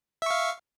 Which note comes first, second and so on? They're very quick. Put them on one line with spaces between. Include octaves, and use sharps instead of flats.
E5 C#6 F5